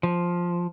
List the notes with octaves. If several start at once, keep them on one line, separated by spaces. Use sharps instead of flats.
F3